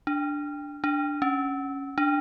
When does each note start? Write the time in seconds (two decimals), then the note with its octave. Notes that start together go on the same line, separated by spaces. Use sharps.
0.07 D4
0.84 D4
1.22 C#4
1.98 D4